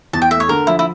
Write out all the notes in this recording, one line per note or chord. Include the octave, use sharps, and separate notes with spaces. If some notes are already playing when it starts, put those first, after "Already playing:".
E2 A5
G5
A3 E5
C#5
D3 A#4
F3 E4
E4